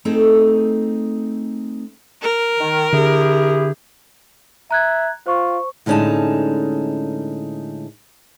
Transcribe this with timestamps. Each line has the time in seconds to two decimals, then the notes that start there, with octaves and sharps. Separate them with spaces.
0.05 A3 C4 D#4 G#4 A4
2.22 A#4
2.59 D#3
2.93 D3 E4 G4 G#4
4.71 E5 A#5 F#6 G#6
5.26 F4 C5 C#6
5.86 A2 D3 G#3 C#4 D#4 A5